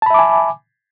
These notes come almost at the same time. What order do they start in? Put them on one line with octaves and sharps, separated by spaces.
A5 B5 E5 D6 G#5